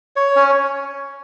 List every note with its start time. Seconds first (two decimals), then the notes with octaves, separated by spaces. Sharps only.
0.16 C#5
0.36 C#4